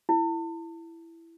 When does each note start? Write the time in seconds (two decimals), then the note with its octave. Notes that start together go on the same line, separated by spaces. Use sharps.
0.09 E4